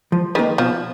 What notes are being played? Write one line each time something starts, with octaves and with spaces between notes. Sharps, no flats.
F3
D#3 A#3 D#4 G#4 B4
B2 F3